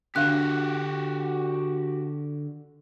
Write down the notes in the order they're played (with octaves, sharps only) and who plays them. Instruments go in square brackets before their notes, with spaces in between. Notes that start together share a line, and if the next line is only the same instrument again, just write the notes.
[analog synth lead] D3 [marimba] D4 F5 [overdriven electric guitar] F#4 G4 [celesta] F#6